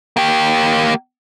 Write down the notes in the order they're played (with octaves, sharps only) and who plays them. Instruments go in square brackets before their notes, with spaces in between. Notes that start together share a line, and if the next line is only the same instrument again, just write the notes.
[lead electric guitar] A#3 G4